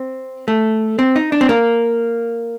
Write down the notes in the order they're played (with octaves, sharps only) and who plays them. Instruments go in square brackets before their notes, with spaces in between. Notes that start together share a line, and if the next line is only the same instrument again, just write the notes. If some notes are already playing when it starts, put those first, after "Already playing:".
Already playing: [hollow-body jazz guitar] C4
A3
C4
D#4
D4
C4
A#3